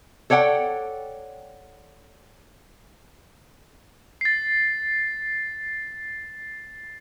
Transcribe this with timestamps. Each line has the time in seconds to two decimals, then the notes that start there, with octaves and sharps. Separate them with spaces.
0.30 A4 C#5 D5 F#5 G5
4.21 A6 C7